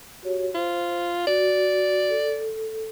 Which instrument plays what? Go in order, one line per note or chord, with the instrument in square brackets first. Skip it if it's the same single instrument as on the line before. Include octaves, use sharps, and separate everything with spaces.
[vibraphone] F#4 G4 C#5
[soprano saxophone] F4 [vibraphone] C5
[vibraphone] F#4 [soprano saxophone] D5
[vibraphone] A4